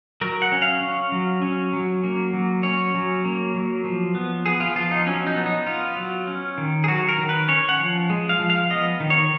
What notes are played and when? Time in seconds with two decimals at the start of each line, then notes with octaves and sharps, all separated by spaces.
0.21 F#3 A#4
0.42 F#5
0.52 C#4
0.62 F5
0.81 C#4
1.12 F#3
1.42 C#4
1.73 F#3
2.04 A#3
2.33 F#3
2.63 C#4 C#5
2.94 F#3
3.25 A#3
3.54 F#3
3.85 F3
4.15 B3
4.46 B3 G#4
4.60 F4
4.76 F3 F4
4.91 D#4
5.06 F#3 C#4
5.27 D#4
5.36 B3
5.46 D#4
5.66 B3 F4
5.97 F#3
6.27 C#4
6.58 D#3
6.84 G#4
6.88 F#3 F#4
7.09 A#4
7.18 D#3
7.29 B4
7.48 C#4 C#5
7.69 F#5
7.79 F3
8.10 G#3
8.29 F5
8.39 F3
8.50 F5
8.70 B3 D#5
9.00 D#3
9.10 C#5